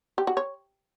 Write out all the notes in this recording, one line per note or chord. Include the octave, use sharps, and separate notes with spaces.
G4
F#4
C#5